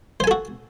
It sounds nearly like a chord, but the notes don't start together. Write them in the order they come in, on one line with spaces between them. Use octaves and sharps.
C5 G#5 A4 F#4